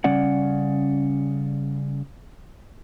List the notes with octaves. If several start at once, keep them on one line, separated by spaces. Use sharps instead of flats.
C#3 G3 C#4 D5 F#5